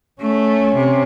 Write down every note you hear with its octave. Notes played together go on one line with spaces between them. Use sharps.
A3 C#4
C3